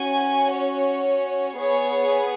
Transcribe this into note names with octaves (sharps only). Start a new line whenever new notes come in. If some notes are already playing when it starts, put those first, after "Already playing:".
Already playing: C#4 F#4 G#5
C#5
B3 G#4 C#5